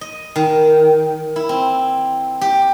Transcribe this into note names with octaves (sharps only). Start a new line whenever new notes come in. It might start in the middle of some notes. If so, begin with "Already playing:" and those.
D#5
D#3
E4
C4
G4